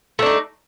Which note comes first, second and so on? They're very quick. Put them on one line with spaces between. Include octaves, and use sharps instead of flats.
A3 D4 D#4